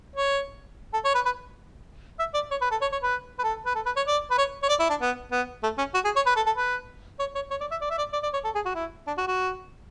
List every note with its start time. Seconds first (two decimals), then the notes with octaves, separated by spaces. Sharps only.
0.16 C#5
0.94 A4
1.04 C#5
1.15 B4
1.25 B4
2.19 E5
2.34 D5
2.51 C#5
2.61 B4
2.71 A4
2.81 C#5
2.92 C#5
3.03 B4
3.39 B4
3.43 A4
3.66 B4
3.75 A4
3.86 B4
3.96 C#5
4.07 D5
4.31 B4
4.38 C#5
4.63 C#5
4.69 D5
4.80 E4
4.90 D4
5.01 B3
5.32 B3
5.63 A3
5.78 C#4
5.94 F#4
6.05 G#4
6.16 C#5
6.26 B4
6.36 A4
6.46 A4
6.56 B4
7.19 C#5
7.35 C#5
7.50 C#5
7.61 D5
7.71 E5
7.81 D5
7.90 E5
7.98 D5
8.13 D5
8.23 D5
8.33 C#5
8.44 A4
8.55 G#4
8.65 F#4
8.75 E4
9.07 D4
9.17 F#4
9.28 F#4